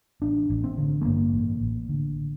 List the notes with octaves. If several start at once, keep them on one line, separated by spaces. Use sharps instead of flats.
A1 D4
A1
C4
D3
A3
G2 A#3
A1
A1
D3